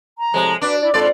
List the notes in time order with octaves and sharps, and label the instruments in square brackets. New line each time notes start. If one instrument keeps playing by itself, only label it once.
[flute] A#5
[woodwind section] A2 C3 F3 [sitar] G#3
[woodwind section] F#3 D6 [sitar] D4 [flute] B4
[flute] E4 [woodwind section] D5
[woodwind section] F2 C6 [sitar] G#2 D5 [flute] A4